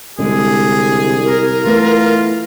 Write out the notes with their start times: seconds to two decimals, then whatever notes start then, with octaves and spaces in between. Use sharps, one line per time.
0.19 C2 D3 G#3 G#4
1.25 A#4
1.65 E3 A3 B3 F4